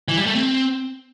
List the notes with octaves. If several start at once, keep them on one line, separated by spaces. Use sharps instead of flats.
E3
G3
A3
C4